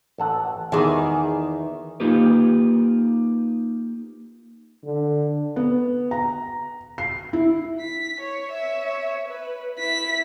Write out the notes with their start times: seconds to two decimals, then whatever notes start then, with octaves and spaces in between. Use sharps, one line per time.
0.18 A1 A4 F#5
0.72 E2 D#3 E3 G#4
2.00 A#3 D#4 F4 G4 B4
4.84 D3
5.56 B3
6.11 A#5
6.98 C7
7.33 E4
7.80 B6
8.21 C#5
8.52 C#5 E5
9.28 B4
9.77 E4 B6